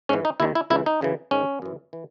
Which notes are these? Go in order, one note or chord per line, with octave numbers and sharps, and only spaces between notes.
G#2 E3 C#4
D#4
D#2 D#3 E4
E4
C#2 C#3 E3 E4
D#4
F#2 C#3 E3
G#2 D#3 C#4
F#2 E3
E3